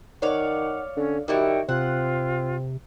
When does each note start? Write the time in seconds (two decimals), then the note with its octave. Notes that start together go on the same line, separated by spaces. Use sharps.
0.22 D#3 C#5 D5 F5 F#5
0.96 D3 C#4
1.28 D#3 G3 E4 F#4 G5
1.69 C3 C4 F4 F#5